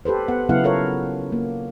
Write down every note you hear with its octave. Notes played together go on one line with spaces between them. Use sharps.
G4 A4 B4 C5
B3 F#5
C#3 F#3 B3 E4 F5 F#5
F4 A4 A#4 C#5 F5
A#3